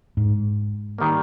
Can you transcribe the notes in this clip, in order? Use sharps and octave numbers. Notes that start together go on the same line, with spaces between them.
G#2
D#3 G3 A#3